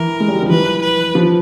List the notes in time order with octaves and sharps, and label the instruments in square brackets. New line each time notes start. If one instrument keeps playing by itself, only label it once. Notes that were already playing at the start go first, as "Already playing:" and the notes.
Already playing: [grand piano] E3 [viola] A#4
[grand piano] G#3
G3
F#3
F3
[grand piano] E3 [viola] B4
[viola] B4
[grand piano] F3